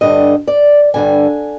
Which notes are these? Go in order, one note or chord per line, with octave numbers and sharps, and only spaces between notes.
G2 D3 G3 D#5
D5
G2 D3 G3 G#5